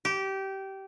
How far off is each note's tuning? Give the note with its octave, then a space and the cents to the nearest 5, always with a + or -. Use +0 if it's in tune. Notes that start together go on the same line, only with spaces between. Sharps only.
G4 -20